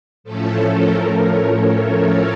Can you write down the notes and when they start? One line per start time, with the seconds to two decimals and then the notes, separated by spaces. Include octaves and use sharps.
0.24 A2 F3 A3 C#4 A4
0.70 A#4
1.15 C#5